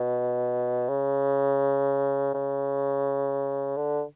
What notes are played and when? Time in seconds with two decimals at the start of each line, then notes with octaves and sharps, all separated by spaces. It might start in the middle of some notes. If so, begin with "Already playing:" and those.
Already playing: B2
0.89 C#3
2.34 C#3
3.77 D3